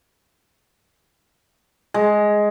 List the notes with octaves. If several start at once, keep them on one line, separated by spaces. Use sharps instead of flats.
G#3